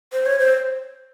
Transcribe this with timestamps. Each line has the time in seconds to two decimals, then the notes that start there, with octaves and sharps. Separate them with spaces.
0.13 C5
0.26 C#5
0.39 C5